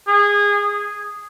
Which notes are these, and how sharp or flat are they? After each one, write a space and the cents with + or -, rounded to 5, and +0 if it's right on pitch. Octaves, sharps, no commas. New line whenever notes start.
G#4 -20
G#4 -10